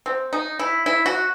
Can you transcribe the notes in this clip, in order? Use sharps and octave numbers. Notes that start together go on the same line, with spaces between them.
C4
D#4
E4
E4
F#4